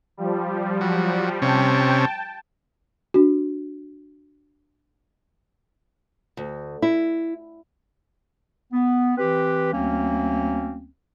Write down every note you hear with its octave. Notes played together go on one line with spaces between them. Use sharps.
F3 G3
F#3
C3 C#4 G5 A5
D4 F#4
D2
E4
B3
E3 C4 G4 B4
D2 F#3 A#3 C4 C#4